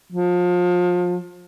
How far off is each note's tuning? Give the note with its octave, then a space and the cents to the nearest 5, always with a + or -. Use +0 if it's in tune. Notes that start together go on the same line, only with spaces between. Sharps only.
F3 +30